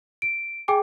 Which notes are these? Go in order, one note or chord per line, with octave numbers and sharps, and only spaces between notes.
D7
G#4 G5 G#5 D6